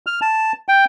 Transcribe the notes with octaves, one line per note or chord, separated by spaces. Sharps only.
F6
A5
G5